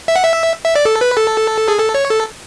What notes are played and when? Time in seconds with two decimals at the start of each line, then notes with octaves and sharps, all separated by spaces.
0.08 E5
0.16 F#5
0.23 E5
0.65 E5
0.76 D5
0.85 A4
1.01 B4
1.17 A4
1.68 G#4
1.79 A4
1.94 C#5
2.10 A4